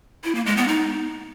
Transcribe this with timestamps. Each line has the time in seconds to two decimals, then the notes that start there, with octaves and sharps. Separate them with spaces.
0.24 E4
0.35 A#3
0.46 G#3
0.57 B3
0.68 D#4